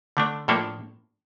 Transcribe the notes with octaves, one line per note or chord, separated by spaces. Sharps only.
D3 A3 D4
A2 F3 A#3 D4 A4